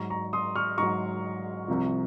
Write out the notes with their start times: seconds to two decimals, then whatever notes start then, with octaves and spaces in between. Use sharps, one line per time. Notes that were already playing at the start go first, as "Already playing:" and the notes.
Already playing: G#2 F#3 A#5 C#6
0.10 A#5 C#6
0.33 C6 D#6
0.56 C#6 F6
0.78 G#2 F#3 A#5 C#6
1.68 C2 C3 F3